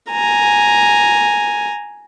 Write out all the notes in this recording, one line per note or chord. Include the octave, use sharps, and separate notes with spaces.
G#5 A#5